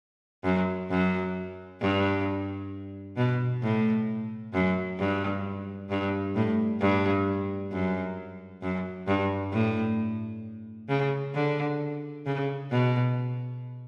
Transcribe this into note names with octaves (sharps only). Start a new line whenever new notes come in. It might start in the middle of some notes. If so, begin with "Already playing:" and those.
F#2
F#2
G2
B2
A2
F#2
G2
G2
A2
G2
F#2
F#2
G2
A2
C#3
D3
C#3
B2